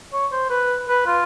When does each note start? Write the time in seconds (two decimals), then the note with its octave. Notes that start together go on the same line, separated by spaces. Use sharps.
0.13 C#5
0.32 C5
0.50 B4
0.89 B4
1.06 F4